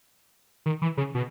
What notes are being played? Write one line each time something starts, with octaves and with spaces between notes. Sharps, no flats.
D#3
E3
C#3
B2